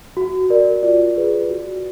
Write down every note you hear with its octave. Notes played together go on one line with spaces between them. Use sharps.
F#4
A#4 D5
F4 D5
G#4 B4
F#4